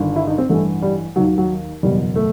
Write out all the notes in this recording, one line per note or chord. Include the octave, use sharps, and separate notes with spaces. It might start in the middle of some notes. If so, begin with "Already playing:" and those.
Already playing: G1 G2 D#3
E4
D#4
C4
A1 G2 E3 A3
G3
D#2 D#3 F#3
F#3
F#3
F#1 E2 B2 G3
A3